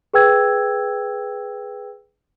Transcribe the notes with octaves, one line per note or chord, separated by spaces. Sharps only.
G#4 B4 G5 E6 G#6